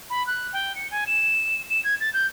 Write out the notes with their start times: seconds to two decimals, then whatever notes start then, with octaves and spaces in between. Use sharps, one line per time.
0.10 B5
0.27 F#6
0.53 G5
0.76 C#7
0.91 G#5
1.07 E7
1.70 E7
1.84 G#6
2.00 A6
2.14 G6